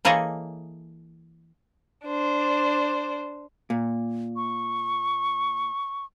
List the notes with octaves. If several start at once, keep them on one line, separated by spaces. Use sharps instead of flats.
E3 A#3 G#4 A4 C#5 D#5
D4 C5
A#2
C#6